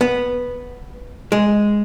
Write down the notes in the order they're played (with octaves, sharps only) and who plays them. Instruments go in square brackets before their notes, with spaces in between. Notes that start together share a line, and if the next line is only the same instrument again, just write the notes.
[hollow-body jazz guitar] B3
G#3